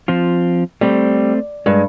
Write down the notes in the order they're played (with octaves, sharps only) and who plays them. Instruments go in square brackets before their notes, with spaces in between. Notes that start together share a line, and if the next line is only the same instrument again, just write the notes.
[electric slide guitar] F3 C4 F4
[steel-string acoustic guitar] G3 [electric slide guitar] A3 C4
[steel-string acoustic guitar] G2 [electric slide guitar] G#3